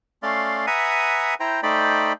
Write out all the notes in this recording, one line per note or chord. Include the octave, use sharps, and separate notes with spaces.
A3 C#4 D5 F5 C6
B4 E5 F#5 G#5 A#5 D#6
E4 C5 G5 A#5
A3 D#4 C5 D5 G5 B5